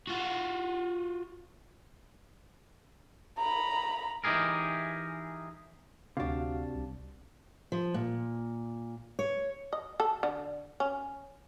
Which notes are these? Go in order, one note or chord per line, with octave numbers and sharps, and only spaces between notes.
F4 F#4
A#5 B5
E3 D#4 G4 G#4 A#4
D2 C3 D4 F#4 F5
C2
F3
A#2
C#5
D#5
A4
D3
C#4